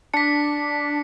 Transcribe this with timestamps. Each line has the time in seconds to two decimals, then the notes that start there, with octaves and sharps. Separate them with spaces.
0.14 D4 B6 C#7